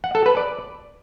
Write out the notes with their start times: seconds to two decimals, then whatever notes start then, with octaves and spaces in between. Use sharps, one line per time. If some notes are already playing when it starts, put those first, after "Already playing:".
0.04 F#5
0.15 A4
0.26 B4
0.37 D5